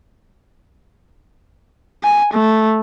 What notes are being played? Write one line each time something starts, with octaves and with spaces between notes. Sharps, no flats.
G#5
A3